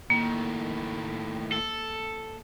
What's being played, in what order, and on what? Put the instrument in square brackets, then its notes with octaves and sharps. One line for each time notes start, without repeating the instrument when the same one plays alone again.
[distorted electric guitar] A2 D#3 [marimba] A#3
[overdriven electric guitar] A4